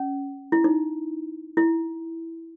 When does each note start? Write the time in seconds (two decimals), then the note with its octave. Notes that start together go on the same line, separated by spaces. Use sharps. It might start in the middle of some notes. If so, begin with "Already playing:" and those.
Already playing: C#4
0.52 E4
0.64 D#4
1.57 E4